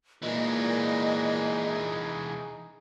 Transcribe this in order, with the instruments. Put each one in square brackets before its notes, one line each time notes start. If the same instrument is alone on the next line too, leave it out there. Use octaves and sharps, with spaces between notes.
[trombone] A#2 [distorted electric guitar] E3 G#3 [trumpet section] D#4 G#4 [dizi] D#5